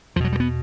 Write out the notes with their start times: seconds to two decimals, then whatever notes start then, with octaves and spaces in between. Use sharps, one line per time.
0.16 E2 F3
0.20 B2 F#3
0.32 G3
0.40 B3